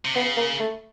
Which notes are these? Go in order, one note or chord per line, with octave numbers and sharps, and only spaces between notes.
C3
C#3 B3
A#3
A3